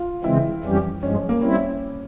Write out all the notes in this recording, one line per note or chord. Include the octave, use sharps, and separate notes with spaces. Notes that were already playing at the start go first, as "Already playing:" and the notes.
Already playing: F4
C#3 E3 G#3 C4 E4
F2 E3 G3 C#4 G4
G2 F3 G#3 C#4
C#4
A#3
G3 C4 C#4 E4